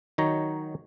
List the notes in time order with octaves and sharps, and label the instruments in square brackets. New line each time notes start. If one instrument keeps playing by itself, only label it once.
[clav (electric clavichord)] D#3 F#3 D#4 C#5 A#5